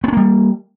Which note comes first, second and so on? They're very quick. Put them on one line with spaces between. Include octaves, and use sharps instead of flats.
B3 C#4 A#3 G3